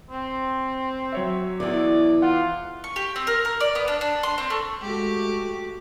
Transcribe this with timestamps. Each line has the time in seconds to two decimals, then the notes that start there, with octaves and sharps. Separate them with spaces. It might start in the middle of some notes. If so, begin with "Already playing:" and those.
0.10 C4
1.13 F#3 C#5 E5
1.60 E2 E3 D5
2.22 F4 F#5
2.84 C#6
2.96 G4
3.16 C4
3.27 A#4
3.45 A#4
3.60 D5
3.75 B3
3.88 D4
4.01 D4
4.23 C6
4.38 C4
4.50 A3
4.82 G#3 A3 F#4 G4 D6